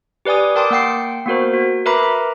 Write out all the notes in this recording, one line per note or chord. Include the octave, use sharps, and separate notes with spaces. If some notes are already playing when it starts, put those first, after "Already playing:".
G4 B4 D5 G#5 D#6
A#4 G5 A5 C6 D6 D#6
A#3 F#5 G5 C7
A#3 B3 F#4 A#4 C5
F#4
A#4 B4 E5 A#5 B5 D6